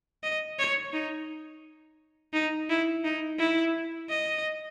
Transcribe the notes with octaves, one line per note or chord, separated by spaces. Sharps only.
D#5
C#5
D#4
D#4
E4
D#4
E4
D#5